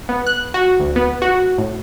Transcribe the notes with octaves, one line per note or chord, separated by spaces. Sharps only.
B3
F#6
F#4
D2
B3
F#4
A2